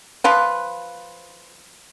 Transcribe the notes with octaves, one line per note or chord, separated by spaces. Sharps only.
F3 F4 B4